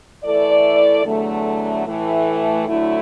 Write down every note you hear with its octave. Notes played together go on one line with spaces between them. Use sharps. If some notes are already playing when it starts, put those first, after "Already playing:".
E3 A3 E4 A4 D5
E2 D3 F#3 A3
A2 E3 A3
D2 D3 F#3 A3 E4